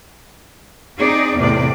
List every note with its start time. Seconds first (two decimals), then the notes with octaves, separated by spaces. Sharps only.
0.99 C4 D#4 G#4 D5
1.36 E2 A2 C3 D5